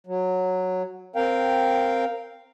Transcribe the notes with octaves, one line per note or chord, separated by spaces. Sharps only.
F#3
C4 A#4 F5 G5